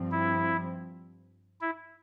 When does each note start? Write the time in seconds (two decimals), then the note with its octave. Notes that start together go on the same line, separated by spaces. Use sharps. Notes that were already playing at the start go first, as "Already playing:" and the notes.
Already playing: G2 F3 C4
0.12 E4
1.61 E4